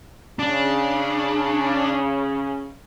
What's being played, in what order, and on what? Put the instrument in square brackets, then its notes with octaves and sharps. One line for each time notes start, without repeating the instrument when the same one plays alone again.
[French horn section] C#3 [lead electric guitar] D4